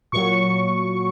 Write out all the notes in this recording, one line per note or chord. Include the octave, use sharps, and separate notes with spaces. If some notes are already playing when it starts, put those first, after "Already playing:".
A#2 F#3 C#6